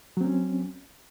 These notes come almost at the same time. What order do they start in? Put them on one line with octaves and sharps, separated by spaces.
F#3 C4 C#4